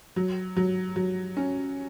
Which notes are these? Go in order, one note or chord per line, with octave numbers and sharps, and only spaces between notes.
F#3
F#3
F#3
C#4